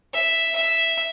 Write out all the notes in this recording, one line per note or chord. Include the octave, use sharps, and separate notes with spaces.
E5
E5